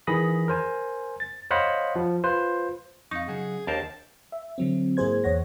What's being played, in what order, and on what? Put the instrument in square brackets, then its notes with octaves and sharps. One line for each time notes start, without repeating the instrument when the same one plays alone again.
[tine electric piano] D#3 E3 G#4 B5 D#6 A#6
A#4 C5 G#5
A6
C5 C#5 D#5 F5 F#5 B5
F3
F4 B4 C5
[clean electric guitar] F2 [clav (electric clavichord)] D#4 [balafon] F5 C#6
[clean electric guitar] C#3 F#3 F#5 [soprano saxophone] G#4
[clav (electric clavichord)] D#2 A#4 C5 [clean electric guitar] D4 [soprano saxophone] A5
[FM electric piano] E5
D3 F#3 C4
G#2 A#3 E4 G#4 C5 G#6
E2 C#5 F#5 A#6